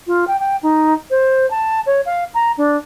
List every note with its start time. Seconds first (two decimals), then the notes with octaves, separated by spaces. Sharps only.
0.07 F4
0.28 G5
0.40 G5
0.63 D#4
1.11 C5
1.51 A5
1.86 C#5
2.06 F5
2.34 A#5
2.58 D4